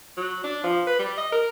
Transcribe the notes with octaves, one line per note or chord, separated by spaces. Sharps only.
F#3
D4
F3
B4
G3
D#5
A#4